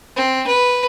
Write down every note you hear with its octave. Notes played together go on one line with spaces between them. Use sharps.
C4
B4